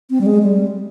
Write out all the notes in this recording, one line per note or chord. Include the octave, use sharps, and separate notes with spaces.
C4
G3
G#3
G3